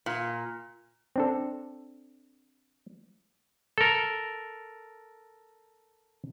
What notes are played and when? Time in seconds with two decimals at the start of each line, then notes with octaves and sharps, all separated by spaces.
0.06 A#2
1.16 C4 D4 A4
3.78 A4 A#4